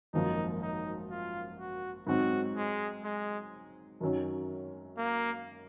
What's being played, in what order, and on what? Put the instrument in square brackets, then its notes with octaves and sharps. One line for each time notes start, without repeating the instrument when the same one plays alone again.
[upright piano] G#1 F#2 F3 A#3 [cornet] D#4
[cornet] D#4
F4
F#4
[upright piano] G#2 F#3 C4 [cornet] F#4
[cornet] G#3
G#3
[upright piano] F#2 D#3 F#3 C#4
[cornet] A#3